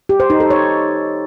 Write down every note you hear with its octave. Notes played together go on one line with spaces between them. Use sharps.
G4
C5
D#4
A4
C#5